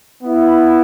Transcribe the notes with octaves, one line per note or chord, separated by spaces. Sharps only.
B3 E4